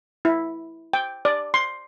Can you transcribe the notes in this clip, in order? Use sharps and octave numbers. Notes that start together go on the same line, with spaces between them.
E4
G5
D5
C6